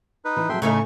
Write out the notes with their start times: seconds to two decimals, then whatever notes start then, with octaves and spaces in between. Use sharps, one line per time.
0.25 D#4 B4
0.37 E3
0.49 F#3 G#4 A4 E5 G5 C6
0.62 A2 C#3 A3 D#4 C#6